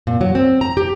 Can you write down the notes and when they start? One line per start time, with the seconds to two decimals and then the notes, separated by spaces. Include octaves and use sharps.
0.07 A#2
0.21 F#3
0.35 C4
0.61 A#5
0.77 G4